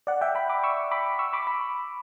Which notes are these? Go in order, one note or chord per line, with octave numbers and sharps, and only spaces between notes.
D5 F#5
E5 G5
G5 B5
B5 D6
C#6 E6
B5 D6
C#6 E6
B5 D6
B5